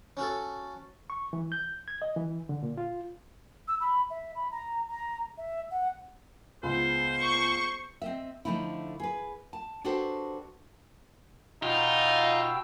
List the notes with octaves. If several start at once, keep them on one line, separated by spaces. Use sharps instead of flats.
C#4 F#4 A4
C#6
E3
G6
G#6
D#5
E3
D3
A#2
F4
E6
B5
E5
B5
A#5
A#5
E5
F#5
C#2 B3 C5 C6
C#6
C4 D#5 E5
D3 F3 A3 D#4 E4
G#4 B4
A5
D4 F#4 G4 A4 B4 C5
B2 D#4 F4 G5 E6